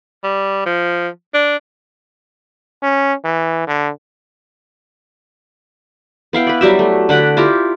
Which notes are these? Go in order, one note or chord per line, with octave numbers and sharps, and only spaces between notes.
G3
F3
D4
C#4
E3
D3
B3 E4 F5 G5
B4 D5
F#3 G3 G4 E5
A3
D3 B4 F#5 G5
E4 F4 G4 A#5